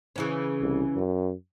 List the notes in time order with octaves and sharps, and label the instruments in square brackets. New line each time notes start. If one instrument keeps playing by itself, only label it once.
[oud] C#3 E3 C#4
[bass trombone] C2
F#2